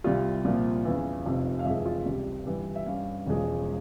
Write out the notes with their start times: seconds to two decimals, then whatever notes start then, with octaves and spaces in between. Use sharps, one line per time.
0.04 C2 C3 G3 F4
0.45 C2 A#2 F3 A#3
0.85 E2 C#3 E3
1.26 F1 F2 C3
1.59 F5
1.65 F1 F2 E3 G#3 E5
1.86 F4
2.06 C#2 C3 G3
2.46 G2 E3 G3
2.75 E5
2.86 G2 G3 C#4 F5
3.26 E1 E2 C#3 F3 G#3